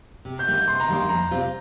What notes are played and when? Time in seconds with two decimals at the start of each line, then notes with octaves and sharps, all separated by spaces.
0.25 C3
0.39 G6
0.47 D#3 G3 A#3
0.53 G6
0.68 C3 C6
0.80 A#5
0.89 D#3 G3 A#3 C6
1.09 F2 A#5
1.31 C3 G3 C4 F4